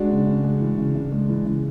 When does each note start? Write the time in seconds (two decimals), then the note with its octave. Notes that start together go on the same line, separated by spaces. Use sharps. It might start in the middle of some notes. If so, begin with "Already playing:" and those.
Already playing: G#3 D4 F#4
0.11 C#3
0.27 C#3
0.44 G#3
0.61 E3
0.78 C#3
0.95 C#3
1.12 G#3
1.29 E3
1.45 C#3